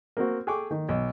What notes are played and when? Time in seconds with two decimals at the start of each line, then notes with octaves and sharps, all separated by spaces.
0.17 A#3 C4 F#4
0.47 G#4 A4 G5 G#5 C#6 D6
0.71 D#3
0.89 B1